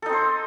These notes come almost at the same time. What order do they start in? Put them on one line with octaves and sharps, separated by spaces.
A4 D#4 C4 C5